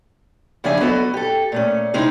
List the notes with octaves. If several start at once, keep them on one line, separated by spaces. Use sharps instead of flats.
C#3 F3 D4 G#4 E5 G#5
F#3 B3 F#4 A4 B4 D#5
G4 A4
A#2 A3 C#4
C3 G#3 C4 C#4 D#4 E4